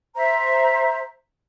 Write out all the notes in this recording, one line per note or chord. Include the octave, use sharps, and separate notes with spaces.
C5 E5 A#5